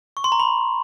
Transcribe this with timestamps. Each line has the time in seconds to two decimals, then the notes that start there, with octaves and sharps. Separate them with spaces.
0.17 C#6
0.24 C6
0.32 A#5
0.40 B5